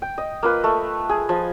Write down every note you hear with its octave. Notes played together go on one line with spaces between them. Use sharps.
G5
D#5
A#3 F4 B4
A3
G#4
F3